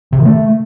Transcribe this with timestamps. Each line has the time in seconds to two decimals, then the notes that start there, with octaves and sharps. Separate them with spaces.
0.12 C3
0.19 D#3
0.25 A3